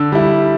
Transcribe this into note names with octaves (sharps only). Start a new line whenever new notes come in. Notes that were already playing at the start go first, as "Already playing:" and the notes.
Already playing: D3 E6
G3 E4